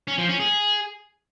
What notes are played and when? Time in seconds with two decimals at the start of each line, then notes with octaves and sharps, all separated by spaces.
0.08 C#4
0.18 F3
0.29 C#4
0.40 G#4